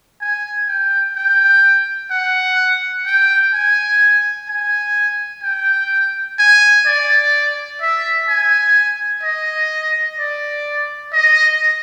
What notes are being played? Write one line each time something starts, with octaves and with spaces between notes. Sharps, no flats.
G#5
G5
G5
F#5
G5
G#5
G#5
G5
G#5
D5
E5
G#5
D#5
D5
D#5